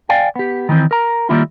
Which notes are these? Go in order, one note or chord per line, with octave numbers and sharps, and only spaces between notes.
D5 F5 G5 G#5
B3 G4
D#3 E3 A3 C4
A#4 A#5
D#3 G3 G#3 A#3 E4 F4